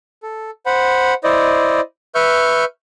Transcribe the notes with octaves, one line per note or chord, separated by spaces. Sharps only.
A4
C5 F#5 B5
E4 C5 D5 D#5
B4 E5 C#6 F6 G6